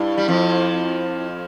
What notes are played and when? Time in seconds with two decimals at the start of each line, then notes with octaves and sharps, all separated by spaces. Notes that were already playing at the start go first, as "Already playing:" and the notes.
Already playing: G2 E4
0.18 G3
0.28 F2 F3